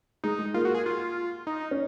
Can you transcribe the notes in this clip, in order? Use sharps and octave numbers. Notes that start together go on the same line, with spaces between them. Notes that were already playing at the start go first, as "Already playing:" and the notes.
G#3 D#4
G#3
A#3 F4
F#4
G#4
F4
D#4
C#4